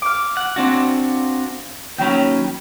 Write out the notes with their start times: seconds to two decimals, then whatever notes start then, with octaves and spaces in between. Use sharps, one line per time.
0.02 F5 D6
0.37 F#5
0.56 C4 D4 F#4
1.98 D#2 F#3 C#4 G5 B5